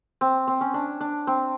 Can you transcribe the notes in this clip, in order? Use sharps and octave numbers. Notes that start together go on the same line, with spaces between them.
C4
C4
C#4
D4
D4
C4